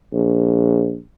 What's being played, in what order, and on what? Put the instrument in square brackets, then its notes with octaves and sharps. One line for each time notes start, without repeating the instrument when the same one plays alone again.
[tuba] A#1